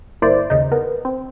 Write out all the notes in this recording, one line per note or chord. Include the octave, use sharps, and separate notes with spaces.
G1 A#3 E4 C5 D5
D#2 C#3 D#4
B3 A#4
C4